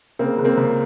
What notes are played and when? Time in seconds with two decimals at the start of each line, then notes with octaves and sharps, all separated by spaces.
0.19 C#3 A#3 C4
0.38 C#2
0.45 A#3 C4
0.57 C#2